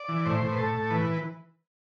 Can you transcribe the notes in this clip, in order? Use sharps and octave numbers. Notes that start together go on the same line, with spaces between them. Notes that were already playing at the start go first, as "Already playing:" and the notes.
Already playing: D5
E3
A2 C5
A2
B4
A2 A4
A2
E3 B4